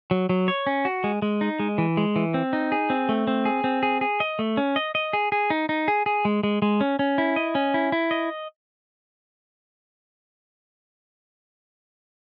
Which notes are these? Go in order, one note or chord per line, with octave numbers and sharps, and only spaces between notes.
F#3
F#3
C#5
C#4
F#4
G#3
G#3
D#4
G#3
E3
G#3
E3
C4
D#4
G#4
C4
A3
C4
G#4
C4
G#4
G#4
D#5
A3
C#4
D#5
D#5
G#4
G#4
D#4
D#4
G#4
G#4
G#3
G#3
G#3
C#4
C#4
E4
D#5
C#4
E4
E4
D#5